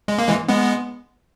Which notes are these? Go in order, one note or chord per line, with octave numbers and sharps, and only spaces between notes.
G#3
A#3
E3 G#3
G#3 B3